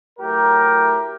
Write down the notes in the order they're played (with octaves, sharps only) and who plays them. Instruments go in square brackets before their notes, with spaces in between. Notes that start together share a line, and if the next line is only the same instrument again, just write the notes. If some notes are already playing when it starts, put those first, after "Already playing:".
[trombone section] A2 F#3 A3 G4 A#4